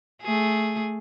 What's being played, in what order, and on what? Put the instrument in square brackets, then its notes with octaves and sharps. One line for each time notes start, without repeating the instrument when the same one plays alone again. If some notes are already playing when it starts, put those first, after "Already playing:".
[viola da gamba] A3 G#4